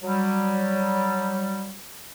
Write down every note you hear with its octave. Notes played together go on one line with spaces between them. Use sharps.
F#3 G3